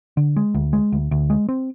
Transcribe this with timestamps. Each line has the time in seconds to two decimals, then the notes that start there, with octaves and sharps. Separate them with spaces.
0.17 D3
0.37 G#3
0.54 D2
0.73 G#3
0.92 D2
1.11 D2
1.30 G#3
1.49 C4